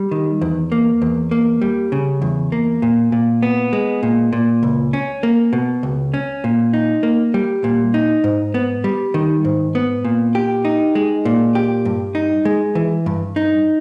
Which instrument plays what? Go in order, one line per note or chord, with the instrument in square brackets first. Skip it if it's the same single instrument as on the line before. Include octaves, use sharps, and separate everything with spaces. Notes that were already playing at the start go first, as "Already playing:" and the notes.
Already playing: [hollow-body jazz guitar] G3
D#3
E2
A#3
E2
A#3
G3
C#3
E2
A#3
A#2
A#2
B3
G#3
A#2
A#2
C#2
C#4
A#3
B2
C#2
C#4
A#2
D#4
A#3
G3
A#2
D#4
G#2
B3
G3
D#3
G#2
B3
A#2
G4
D#4
G#3
A#2
G4
G2
D#4
G#3
E3
G2
D#4